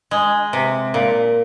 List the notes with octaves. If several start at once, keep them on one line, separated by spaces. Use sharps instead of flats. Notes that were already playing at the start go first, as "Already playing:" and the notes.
G#3
C3
A#2